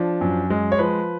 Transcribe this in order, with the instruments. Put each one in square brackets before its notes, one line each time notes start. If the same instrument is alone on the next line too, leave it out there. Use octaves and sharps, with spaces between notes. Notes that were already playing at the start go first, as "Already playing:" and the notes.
Already playing: [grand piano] F3 D4
F#2
G#3
C#5
F3 B4